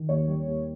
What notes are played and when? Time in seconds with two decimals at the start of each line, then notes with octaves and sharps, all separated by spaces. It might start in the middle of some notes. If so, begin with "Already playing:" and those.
Already playing: D#3
0.09 D#2 C#5
0.28 G3
0.48 D#2